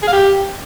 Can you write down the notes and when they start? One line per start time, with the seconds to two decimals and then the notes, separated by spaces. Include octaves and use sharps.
0.02 G#4
0.08 F5
0.13 G4